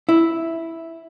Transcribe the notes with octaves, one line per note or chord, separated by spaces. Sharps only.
E4